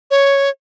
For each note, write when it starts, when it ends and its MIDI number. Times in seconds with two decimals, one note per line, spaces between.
0.11 0.50 73